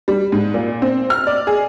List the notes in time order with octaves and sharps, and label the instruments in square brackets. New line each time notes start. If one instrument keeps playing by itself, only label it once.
[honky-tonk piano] G3
G#2
A#2
C4
F6
D5
G#4